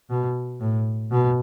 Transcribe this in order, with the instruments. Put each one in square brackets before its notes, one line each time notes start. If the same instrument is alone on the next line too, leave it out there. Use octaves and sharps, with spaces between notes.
[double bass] B2
A2
B2